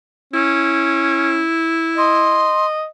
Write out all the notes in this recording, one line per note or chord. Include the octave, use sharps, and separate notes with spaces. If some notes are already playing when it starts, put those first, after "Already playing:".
C#4 E4
D#5 C6